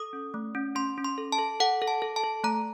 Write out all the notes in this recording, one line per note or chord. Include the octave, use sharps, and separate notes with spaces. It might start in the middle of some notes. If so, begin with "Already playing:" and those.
Already playing: A4 D#6
C#4
A3
C#4
C#4 C6
C#4
C6
A4
A5
A4
A4 F#5
A4
A5
A4
A5
A4
A3 A#5